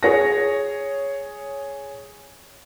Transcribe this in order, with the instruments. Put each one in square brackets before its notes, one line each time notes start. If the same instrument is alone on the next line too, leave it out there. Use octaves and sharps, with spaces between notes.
[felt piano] G#4 C#5 A#6